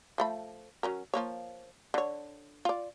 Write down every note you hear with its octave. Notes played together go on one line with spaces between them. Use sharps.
F3 A3 B5
F#3 C#4 A#4
F3 A#3 C#5
D3 C#5
F4 D5